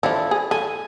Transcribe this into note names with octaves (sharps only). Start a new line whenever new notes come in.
F3 D4 E4 A4
G#4
A4 G#5